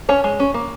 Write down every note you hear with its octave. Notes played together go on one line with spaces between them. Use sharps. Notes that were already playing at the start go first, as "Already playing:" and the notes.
C#4 C#5
G#3
C#4
A#3